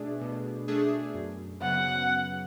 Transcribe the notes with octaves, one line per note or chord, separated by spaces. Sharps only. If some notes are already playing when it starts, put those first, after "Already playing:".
Already playing: B2 A3 D4 G#4
B2
A3 D4 G#4
F#2
C#3 F#3 B3 F#5